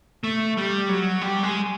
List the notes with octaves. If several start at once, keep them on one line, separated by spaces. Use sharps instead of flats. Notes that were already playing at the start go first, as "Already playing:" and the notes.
A3
G3
F#3
G3
G#3